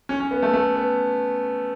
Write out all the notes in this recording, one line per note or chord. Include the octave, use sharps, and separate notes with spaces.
C#4
C#4
B3
A3
A3
B3